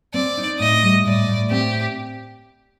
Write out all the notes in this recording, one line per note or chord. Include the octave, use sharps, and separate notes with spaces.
C4 D5
D#4
A2 D#5
G3
A2 D5
A2
C4 G4